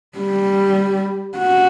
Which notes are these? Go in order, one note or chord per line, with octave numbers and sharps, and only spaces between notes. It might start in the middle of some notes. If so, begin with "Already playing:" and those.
G3
F#4